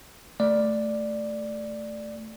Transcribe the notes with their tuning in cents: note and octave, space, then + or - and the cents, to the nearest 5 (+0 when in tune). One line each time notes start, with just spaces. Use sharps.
A3 +0 D5 +5